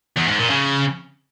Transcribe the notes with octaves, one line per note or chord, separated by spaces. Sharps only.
E2
G#2
A#2
C#3